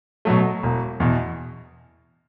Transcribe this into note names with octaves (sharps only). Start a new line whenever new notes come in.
B2 F#3 A3
E1
E2 B2